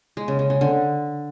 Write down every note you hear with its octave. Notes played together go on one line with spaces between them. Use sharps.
G#3
C#3
C#3
C#3
D3